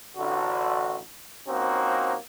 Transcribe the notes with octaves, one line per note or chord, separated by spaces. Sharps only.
A1 D3 F#4
F3 A#3 C4 C#4 D#4 F#4